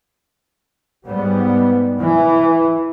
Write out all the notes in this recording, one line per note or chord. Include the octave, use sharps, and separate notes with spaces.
G#2 G3 B3
E3